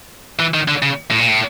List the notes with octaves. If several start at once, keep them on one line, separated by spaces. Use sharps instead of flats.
E3
D#3
D3
C#3
A2
A#2
A2